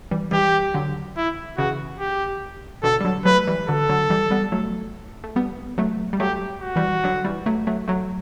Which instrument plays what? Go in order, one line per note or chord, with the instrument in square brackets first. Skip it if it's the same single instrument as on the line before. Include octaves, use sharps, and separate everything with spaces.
[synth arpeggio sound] E3 G3
[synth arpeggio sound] E3 G3 [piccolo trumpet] G4
[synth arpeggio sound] D3 F#3
[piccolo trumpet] E4
[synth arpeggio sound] C#3 E3 [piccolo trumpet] F#4
[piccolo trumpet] G4
[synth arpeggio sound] B2 D3 [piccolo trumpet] A4
[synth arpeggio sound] G3
D3 F#3
[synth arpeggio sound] F#3 A3 [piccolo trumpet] B4
[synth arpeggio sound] E3 G3
[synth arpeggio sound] D3 F#3 [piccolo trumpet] A4
[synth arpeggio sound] D3 F#3
E3 G3
G3 B3
F#3 A3
A3
G3 B3
F#3 A3
G3
[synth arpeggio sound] F#3 A3 [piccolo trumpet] G4
[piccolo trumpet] F#4
[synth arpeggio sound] E3 G3
D3 F#3
E3 G3
F#3 A3
F#3 A3
F#3 A3